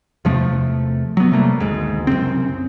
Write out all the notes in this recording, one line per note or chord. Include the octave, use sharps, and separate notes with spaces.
E2 C3 F3 A3
F#3 B3
C3 G3 A3 A#3
G#1 D2 G#2
C2 F#2 C#3 C4